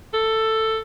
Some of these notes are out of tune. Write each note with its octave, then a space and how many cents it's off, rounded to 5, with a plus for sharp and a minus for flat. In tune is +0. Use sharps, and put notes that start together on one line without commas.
A4 +10